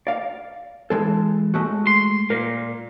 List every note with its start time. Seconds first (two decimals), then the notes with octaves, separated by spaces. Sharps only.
0.07 D5 F5
0.90 E3 G#3 A4
1.54 G#3 A3 F#4
1.87 C6
2.30 A#2 A#4